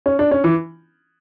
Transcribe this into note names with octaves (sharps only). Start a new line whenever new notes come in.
C#4
D4
C#4
E3